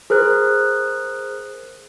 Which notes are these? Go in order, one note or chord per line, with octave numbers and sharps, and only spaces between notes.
G#4 A#4 C5 F#6